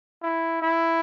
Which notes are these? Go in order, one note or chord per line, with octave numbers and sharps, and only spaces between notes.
E4
E4